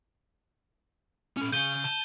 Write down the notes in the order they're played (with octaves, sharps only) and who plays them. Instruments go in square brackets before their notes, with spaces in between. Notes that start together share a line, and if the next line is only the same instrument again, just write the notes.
[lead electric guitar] C#4 A4
[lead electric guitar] C#3 G#5 [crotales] G6 D#7 G7
[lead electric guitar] A5